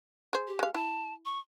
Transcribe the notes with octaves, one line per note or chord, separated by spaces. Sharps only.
G#4 C5
G4
G#3 F5
E4 A5
C#6